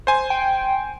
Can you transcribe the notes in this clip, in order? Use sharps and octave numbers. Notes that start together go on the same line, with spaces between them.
C5 G#5
G5